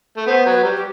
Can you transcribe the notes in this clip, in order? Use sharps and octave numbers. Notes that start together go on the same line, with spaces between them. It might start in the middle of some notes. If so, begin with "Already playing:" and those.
A3
B3 C5
F#3
B4
G3
G4